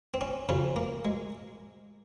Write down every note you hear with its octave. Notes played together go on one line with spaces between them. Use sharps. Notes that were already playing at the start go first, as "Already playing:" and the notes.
C4
C#4
F2 C#3 F3 C#4
A#3
G#3